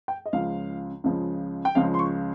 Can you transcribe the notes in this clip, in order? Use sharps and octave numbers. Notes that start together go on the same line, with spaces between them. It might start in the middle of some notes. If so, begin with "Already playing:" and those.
G5
D#5
C#2 C#3 F3 G#3 F5
C#2 C#3 F3 G#3
G5
C#2 C#3 F3 G#3 F5
C6
C#6